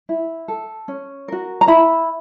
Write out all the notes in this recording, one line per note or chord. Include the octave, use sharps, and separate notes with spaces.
E4
A4
C#4
F#4 A#4
A#5
E4 B5